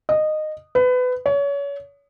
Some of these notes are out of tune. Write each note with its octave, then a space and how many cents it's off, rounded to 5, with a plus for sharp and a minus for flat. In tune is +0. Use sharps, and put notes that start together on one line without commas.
D#5 -15
B4 +25
C#5 +30